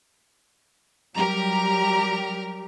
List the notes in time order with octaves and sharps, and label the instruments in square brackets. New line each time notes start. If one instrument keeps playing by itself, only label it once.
[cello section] F#3 G3 G4 [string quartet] A#4 A#5